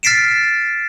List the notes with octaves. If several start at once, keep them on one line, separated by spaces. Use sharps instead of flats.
F6 A6 B6 C7 D7 E7